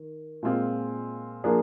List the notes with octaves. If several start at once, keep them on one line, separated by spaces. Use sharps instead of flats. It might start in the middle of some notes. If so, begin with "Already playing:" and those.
Already playing: D#3
A#2 G#3 C4 F4 G#4
F3 A#3 D4 G#4